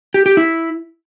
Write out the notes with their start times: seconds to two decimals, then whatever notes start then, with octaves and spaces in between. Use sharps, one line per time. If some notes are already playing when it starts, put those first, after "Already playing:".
0.14 G4
0.26 G4
0.37 E4